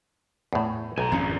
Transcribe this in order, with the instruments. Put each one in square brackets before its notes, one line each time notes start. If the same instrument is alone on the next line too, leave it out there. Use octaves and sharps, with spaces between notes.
[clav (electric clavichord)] E2 A2
[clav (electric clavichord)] B1 [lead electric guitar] G#5 A#5
[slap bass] G#1 F2 C#4 [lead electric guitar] F3 A#3 [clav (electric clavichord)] G#4 C#5